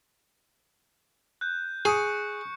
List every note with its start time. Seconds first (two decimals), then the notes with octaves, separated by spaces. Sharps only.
1.41 F#6 G6
1.85 G#4 C#6 C#7